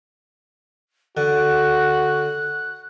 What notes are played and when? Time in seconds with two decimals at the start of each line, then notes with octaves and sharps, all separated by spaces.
1.17 D3 F#4 F#6